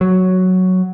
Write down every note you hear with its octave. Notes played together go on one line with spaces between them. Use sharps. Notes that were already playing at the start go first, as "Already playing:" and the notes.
F#3